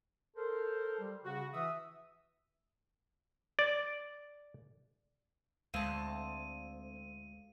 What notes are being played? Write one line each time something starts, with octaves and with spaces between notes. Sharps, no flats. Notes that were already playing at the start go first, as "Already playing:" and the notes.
A4 A#4 C5
G3
C#3 F#4
E3 E5 D#6
D5
D2 G#3 C4 F5 A5 D#7